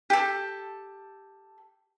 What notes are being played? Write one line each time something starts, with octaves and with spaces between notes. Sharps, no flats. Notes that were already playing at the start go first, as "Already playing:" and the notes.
G4 A4